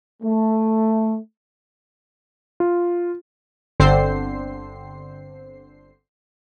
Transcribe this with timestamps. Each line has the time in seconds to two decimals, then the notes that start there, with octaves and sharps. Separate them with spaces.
0.23 A3
2.60 F4
3.80 G1 D3 C4 C5 C7